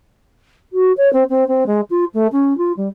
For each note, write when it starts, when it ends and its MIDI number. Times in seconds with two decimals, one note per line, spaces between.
0.73 0.92 66
0.97 1.11 73
1.13 1.24 60
1.29 1.47 60
1.47 1.64 60
1.66 1.81 56
1.90 2.05 65
2.14 2.27 57
2.32 2.56 61
2.58 2.72 65
2.77 2.88 55